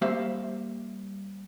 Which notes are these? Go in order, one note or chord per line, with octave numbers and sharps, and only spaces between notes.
G3 A#3 G4 C5 E5 F5